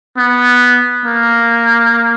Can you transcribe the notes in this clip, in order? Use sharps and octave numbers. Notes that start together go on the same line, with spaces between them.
B3
A#3